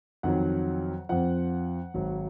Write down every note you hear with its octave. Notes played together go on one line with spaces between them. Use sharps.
F2 D#3 F#3 F#5
F2 F3 F#5
G#1 G#2 F#3